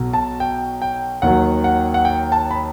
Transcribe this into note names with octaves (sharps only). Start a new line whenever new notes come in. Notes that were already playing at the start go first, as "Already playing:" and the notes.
Already playing: B1 B2 F#3
A5
G5
G5
D#2 D#3 F#3 F#5
F#5
F#5
G5
A5
B5